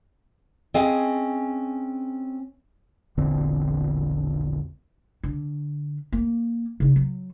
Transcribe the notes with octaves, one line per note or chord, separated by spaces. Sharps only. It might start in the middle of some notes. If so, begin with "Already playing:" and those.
C4 C#4 G#4 D#5 F5 G#5
E1 A#1 D3 C4
D3
A#3
C#3 D#4
F#3